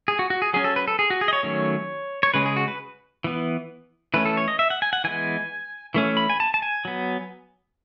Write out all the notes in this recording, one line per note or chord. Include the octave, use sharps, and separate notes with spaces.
G#4
F#4
F#4
G#4
F#3 C#4 G#4
A4
B4
A4
G#4
F#4
G#4
D#5
C#5
D#3 F#3 A3 C#4
C#5
C#3 G#3 C#4 B4
G#4
F#4
B4
E3 B3
E3 A3 C#4 B4
A4
C#5
D#5
E5
F#5
G#5
F#5
E3 G#3 B3 G#5
E3 A3 C#4
B5
G#5
A5
A5
G#5
F#3 B3